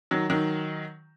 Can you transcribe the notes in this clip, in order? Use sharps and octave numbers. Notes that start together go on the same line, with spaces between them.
D#3 F#3
D#3 F#3